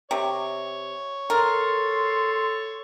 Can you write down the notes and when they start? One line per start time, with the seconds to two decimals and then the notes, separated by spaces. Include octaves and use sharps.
0.11 C3 C#5
1.30 A4 A#4 C6